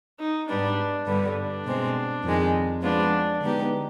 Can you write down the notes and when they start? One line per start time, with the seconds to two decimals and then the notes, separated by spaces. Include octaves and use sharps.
0.20 D#4
0.48 G#2 G3 B3 D4
1.07 G2 D3 G3 B3
1.36 D4
1.65 B2 G#3 C4
2.24 F2 D#3 G#3
2.82 F3 G#3 B3 D4 F4
3.41 D3 G#3 B3 D#4 G4